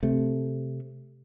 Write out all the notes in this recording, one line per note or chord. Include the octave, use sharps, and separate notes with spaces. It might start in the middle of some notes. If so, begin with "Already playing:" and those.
C3 A3